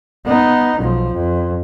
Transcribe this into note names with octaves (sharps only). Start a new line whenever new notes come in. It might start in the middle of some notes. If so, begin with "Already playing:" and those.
B3 D#4
B1 F3
F2